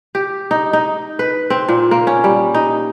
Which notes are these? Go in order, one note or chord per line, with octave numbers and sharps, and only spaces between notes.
G4
D#4
D#4
B4
C4
A#2
A#3
C#4
G3
D#4